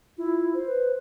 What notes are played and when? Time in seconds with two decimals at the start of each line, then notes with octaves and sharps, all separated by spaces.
0.17 E4 F4
0.54 C5
0.66 B4